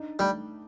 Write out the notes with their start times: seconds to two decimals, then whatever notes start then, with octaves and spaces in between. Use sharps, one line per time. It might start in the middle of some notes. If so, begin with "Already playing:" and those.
Already playing: D4 D#4
0.19 G3 A3